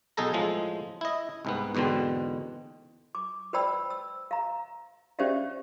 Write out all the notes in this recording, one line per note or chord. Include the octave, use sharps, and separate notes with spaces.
B1 D#4 G#4 A4 A#5
A2 F3 G#3
E4 D#5
C2 G#2 B3
E2 G#2 B2 D3 C4
D6
B4 C5 D5 G5 B5 E6
E6
F5 A#5
C#4 G4 C5 D5 E5 F5